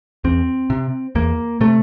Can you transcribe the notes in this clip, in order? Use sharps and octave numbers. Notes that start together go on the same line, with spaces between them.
E2 C4
C3
E2 A#3
C3 A3